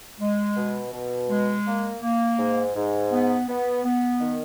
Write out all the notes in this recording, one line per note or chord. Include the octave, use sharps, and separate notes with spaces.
G#3
B2
B2
G#3
A#3
A#3
G#2
G#2
B3
B3
B3
D#3